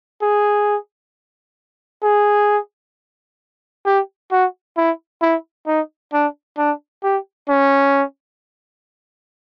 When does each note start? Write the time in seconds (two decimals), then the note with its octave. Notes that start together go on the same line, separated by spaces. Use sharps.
0.22 G#4
2.03 G#4
3.86 G4
4.31 F#4
4.77 E4
5.22 E4
5.67 D#4
6.13 D4
6.58 D4
7.03 G4
7.49 C#4